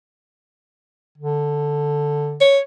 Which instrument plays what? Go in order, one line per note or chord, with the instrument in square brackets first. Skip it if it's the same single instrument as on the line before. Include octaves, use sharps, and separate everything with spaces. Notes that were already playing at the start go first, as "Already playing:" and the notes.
[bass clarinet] D3
[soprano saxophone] C#5